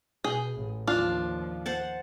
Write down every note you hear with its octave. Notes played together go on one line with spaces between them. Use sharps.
B2 G#4 G5
A1 A2
D#2 F3 D4 F4 F5
C5 F#5 A5